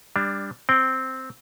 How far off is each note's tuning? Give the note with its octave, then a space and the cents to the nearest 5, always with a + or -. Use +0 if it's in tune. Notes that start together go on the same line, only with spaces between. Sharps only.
G3 +20 D4 +0
C4 +0 G5 -10